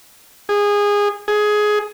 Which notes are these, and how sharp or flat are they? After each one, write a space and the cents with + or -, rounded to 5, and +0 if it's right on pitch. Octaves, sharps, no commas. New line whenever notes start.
G#4 -20
G#4 +15